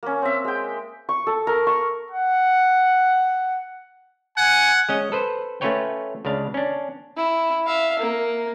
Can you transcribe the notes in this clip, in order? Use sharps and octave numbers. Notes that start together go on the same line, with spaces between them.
A#3 C#4
C4 E5
G#3 G5
C#6
A4
A#4
C#6
F#5
F#5 G#5
G#3 C#4 D#5
A4 B4 C5
A3 C#4 F4 B4 C#5 G5
C#2 C#3 D4 F5
C#4 D4
E4
E5 F5
A#3